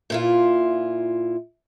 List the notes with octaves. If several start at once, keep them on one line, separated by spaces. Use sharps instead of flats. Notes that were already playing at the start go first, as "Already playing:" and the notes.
A#2 E4 F4